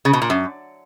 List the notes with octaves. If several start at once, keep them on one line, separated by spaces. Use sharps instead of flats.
C#3
B2
A#2
F#2